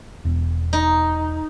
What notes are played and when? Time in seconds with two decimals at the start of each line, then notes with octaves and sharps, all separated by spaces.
0.25 E1
0.73 D#4